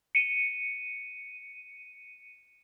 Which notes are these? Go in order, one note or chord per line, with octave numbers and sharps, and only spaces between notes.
C#7 D#7